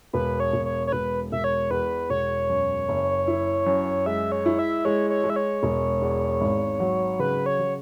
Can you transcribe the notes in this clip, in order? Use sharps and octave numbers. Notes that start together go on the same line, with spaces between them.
E1 B4
C#5
E1
C#5
C#5
E1 B4
E1 E5
C#5
E2 B4
E1 C#5
F#2
F#1
E4
F#2
G#3 E5
C#5
E4
E5
G#3 C#5
C#5
G#3
E5
C#5
E1
E2
G#1
F#3
C#3 B4
C#5
C#3